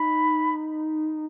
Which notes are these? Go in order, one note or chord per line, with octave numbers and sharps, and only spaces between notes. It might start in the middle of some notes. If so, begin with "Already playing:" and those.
Already playing: D#4 B5